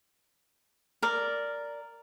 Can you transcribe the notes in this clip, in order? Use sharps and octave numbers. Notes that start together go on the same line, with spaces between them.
A#4 D5